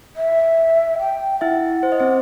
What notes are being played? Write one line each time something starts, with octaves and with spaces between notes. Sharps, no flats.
E5
G5
E4 E5 F#5
C5
D#5
C4 C5